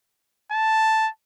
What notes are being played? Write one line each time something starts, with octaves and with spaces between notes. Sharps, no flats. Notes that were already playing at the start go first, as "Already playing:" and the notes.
A5